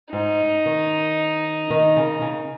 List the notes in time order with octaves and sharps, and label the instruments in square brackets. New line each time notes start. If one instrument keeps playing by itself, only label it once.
[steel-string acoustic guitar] G#2 [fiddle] D#4
[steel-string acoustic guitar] D#3
D#3
C#3
C#3